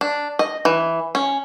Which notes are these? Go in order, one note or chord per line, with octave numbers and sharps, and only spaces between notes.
D4
D#5
E3
C#4